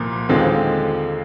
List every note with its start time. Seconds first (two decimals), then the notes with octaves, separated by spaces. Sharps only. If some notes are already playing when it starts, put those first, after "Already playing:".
Already playing: C2 A#2 F3 A#3
0.29 D#2 D3 G#3 C4 F4